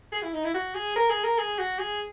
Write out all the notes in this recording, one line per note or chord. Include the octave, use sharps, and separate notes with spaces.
G#4
E4
D#4
E4
F#4
G#4
A#4
G#4
A#4
G#4
F#4
G#4